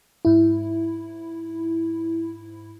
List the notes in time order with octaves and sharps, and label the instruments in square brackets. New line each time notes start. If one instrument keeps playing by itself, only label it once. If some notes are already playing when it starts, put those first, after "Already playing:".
[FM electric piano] G#2 E4